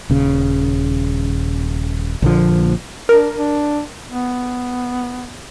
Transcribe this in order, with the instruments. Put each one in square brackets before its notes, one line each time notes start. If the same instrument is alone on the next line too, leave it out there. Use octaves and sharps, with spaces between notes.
[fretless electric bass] D#1 C#3
A#1 D3 E3 F3
[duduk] D4 [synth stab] A#4
[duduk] D4
B3